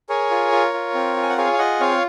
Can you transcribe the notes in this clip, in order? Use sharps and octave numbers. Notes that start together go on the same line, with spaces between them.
G#4 A#4 C#5
F4
F4
F4
C4
F4
G#5
F#5
G#4 C#5 F5
F5
F4 D#5 F#5
C4 C#5 F5